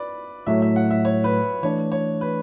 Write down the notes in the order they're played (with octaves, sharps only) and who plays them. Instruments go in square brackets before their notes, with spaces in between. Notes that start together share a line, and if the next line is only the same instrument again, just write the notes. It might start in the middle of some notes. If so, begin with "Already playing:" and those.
Already playing: [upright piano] B4 D5
[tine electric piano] A2 F#3 A3 [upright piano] E5
[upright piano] E5
F#5
E5
C#5
B4
[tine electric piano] E3 A3 D4 [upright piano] C#5
[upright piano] C#5
B4